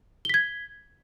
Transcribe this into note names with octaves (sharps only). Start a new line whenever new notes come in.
G#6 B6 G7